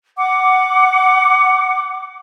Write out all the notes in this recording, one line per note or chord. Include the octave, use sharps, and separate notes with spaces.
F#5 D6